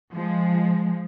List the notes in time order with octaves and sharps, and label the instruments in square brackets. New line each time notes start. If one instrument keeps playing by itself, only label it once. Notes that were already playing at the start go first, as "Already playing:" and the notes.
[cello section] F3 G#3